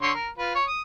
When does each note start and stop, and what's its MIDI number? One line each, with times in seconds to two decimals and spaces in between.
0.02 0.12 50
0.02 0.12 73
0.02 0.12 84
0.14 0.29 70
0.38 0.55 65
0.38 0.55 71
0.55 0.65 73
0.67 0.82 87